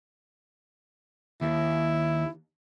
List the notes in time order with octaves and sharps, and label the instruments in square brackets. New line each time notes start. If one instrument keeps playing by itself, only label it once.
[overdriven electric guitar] D#2 [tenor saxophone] E4